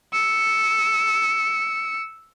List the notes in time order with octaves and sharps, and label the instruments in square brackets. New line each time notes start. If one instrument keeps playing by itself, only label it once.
[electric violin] E6 C#7